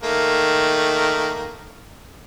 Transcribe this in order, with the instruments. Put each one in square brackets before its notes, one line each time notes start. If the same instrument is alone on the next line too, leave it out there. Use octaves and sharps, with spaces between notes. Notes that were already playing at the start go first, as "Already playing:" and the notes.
[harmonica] D#3 A3 A#3